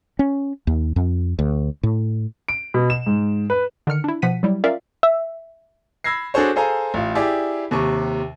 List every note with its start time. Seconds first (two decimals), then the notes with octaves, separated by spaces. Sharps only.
0.19 C#4
0.67 D#2
0.96 F2
1.39 D2
1.83 A2
2.48 D7
2.74 B2
2.90 E7
3.06 G#2
3.50 B4
3.87 D3 D#3 F6 C#7
4.04 D4 E4
4.22 B2 F3 F#5 B6 D#7
4.43 F#3 G3 E4
4.64 C#4 F4 A#4 D5 E5 F5
5.03 E5
6.04 B5 E6 G#6 A#6 C7
6.34 D4 F#4 G#4 A4 C5 C#5
6.56 G#4 A4 C5 F5 G#5 A#5
6.94 A1 F4
7.15 E4 G4 G#4 D5
7.71 D#2 C3 C#6